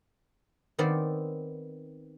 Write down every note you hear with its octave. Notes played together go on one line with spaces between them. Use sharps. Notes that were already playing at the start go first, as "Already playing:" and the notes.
D#3 B3 C4 D5